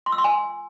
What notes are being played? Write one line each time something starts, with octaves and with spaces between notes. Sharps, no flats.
C6
E6
C6
G#5